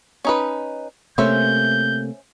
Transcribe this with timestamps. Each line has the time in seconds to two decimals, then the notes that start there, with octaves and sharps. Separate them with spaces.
0.25 C#4 D#4 B4
1.18 C3 A3 A#3 C#4 C5 E5 G6